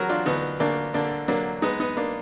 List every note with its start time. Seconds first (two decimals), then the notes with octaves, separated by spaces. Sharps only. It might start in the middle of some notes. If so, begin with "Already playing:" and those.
Already playing: D3 F#3 F#4 A#4 B4
0.09 D4 F4
0.26 D2 B3 D#4
0.60 D2 A#3 D4
0.94 D3 A#3 D4
1.28 F#3 A#3 D4
1.62 G#3 B3 D#4
1.80 B3 D#4
1.97 A#3 D4